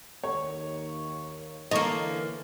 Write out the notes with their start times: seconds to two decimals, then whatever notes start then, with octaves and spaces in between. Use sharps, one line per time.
0.24 D#2 C#5
1.71 D3 E3 A#3 D#5 A#5 C#6